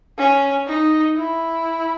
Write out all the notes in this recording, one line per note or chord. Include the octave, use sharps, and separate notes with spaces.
C#4
D#4
E4